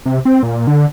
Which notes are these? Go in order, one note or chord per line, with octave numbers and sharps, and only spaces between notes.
C3
C4
A#2
D3